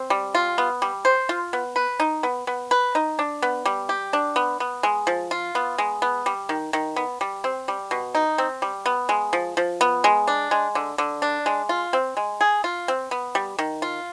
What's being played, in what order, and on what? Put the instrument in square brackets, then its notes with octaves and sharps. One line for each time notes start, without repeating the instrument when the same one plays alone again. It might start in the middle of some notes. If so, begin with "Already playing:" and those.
Already playing: [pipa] C4
G3
F4
B3
G3
C5
F4
B3
B4
D#4
B3
B3
B4
D#4
D4
B3
G3
G4
D4
B3
B3
G#3
F3
F4
B3
G#3
B3
G3
D#3
D#3
B3
G3
C4
G3
B2
D#4
C4
G3
B3
G#3
F3
F3
B3
G#3
D4
G#3
D3
D3
D4
G#3
F4
C4
G#3
G#4
F4
C4
B3
G3
D#3
F4